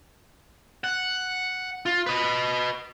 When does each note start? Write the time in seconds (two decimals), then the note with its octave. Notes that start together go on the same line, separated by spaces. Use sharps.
0.84 F#5
1.86 F4
2.06 B4 D#5